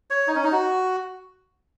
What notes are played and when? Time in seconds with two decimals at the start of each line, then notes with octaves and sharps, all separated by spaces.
0.10 C#5
0.27 D#4
0.36 C#4
0.44 D#4
0.52 F#4